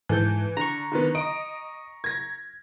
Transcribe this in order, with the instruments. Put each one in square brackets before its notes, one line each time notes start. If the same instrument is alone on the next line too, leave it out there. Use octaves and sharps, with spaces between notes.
[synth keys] G#2 A4 G6 [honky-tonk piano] E3
[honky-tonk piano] D3 [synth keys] A#5 C#6
[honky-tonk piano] D3 D#3 B3
D#5 D7
G#6 A#6